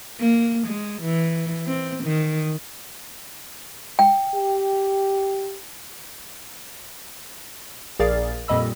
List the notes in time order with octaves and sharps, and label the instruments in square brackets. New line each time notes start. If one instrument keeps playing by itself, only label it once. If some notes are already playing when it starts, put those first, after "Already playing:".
[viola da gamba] A#3
G#3
E3
C4
D#3
[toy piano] G5
[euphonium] G4
[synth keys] A#1 G#4 A#4 D5 F5 A6
F2 A#2 G3 D#5 B5 E6